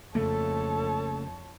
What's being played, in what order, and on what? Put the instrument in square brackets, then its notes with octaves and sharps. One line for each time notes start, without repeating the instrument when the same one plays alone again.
[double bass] F2 [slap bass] C#3 A3 A#3 [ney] A4 [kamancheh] C#5 A5